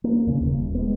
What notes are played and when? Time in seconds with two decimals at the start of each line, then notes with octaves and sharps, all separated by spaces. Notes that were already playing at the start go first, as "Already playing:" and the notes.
0.04 A#3
0.26 D#2 C#3
0.45 D#1
0.75 G#3 B3